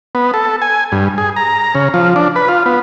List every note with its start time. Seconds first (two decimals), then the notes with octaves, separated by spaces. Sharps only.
0.15 B3
0.34 A4
0.62 G#5
0.92 G2
1.18 G#4
1.36 A#5
1.75 C#3
1.94 F3
2.16 D4
2.36 B4
2.48 F4
2.66 B3